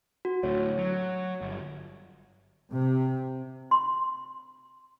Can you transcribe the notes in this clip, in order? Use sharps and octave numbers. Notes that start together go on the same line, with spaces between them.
F#4
D2 A2 C#5
F#3
G1
C3
C6